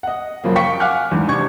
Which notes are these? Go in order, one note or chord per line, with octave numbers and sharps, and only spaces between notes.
D#5 F#5
F#2 C#3 F3 A#3
F5 G5 C#6 B6 C#7
F5 F#5 G#5 D6 F6 F#6
E2 G#2 D3
C3 D4 C#6 G#6